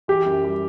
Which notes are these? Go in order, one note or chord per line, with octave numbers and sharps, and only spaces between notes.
E3 G4
F#2
G3